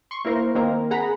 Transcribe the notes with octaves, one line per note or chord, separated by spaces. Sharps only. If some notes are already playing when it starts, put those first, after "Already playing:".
C6 C#6
A#3 E4 A#4 C5
D#3 A#3 C4 A#4
G#4 F#5 A#5 B5